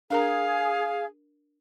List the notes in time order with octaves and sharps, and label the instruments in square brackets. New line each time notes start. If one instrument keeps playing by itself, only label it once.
[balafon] D4 A#4 A#5 [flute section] G#4 [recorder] F5